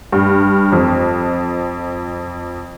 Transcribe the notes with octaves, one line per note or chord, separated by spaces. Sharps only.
G2
F2